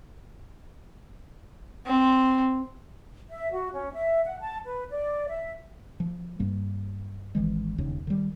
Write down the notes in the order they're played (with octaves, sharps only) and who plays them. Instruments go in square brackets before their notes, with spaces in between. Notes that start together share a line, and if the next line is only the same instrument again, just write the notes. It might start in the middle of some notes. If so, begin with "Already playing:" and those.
[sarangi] C4
[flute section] E5
F#4
C#4
E5
F#5
A5
B4
D5
E5
[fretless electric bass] F3
G2 G3 A#3
G#1 D#3 E3 G#3
E1 D#2 C#3
D#3 G3